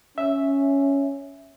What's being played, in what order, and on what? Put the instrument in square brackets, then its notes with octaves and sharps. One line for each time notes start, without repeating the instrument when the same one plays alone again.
[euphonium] C#4 [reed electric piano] E5